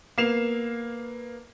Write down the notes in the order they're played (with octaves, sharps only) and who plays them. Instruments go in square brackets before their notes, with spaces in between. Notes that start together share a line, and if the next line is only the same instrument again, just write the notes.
[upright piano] A#3 B3 C7 E7 F7